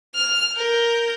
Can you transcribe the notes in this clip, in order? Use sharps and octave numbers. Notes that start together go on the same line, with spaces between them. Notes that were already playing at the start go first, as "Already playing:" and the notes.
F6
A#4 G6